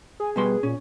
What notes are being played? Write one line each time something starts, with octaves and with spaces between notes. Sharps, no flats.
G#4 G#5
B2 G3 B4 C6
A#2 C#4